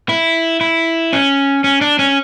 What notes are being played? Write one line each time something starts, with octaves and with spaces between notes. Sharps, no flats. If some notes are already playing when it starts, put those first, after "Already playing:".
E4
E4
C#4
C#4
D4
C#4